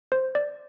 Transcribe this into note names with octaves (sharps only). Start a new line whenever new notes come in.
C5
D5